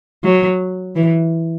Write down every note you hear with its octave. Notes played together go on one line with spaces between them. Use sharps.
F#3
E3